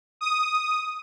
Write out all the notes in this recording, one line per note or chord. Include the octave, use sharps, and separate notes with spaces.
D#6